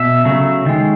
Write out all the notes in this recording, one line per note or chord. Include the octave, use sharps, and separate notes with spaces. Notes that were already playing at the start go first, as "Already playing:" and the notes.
Already playing: B2 E5
C#3 F#3 A3
D#3 G#3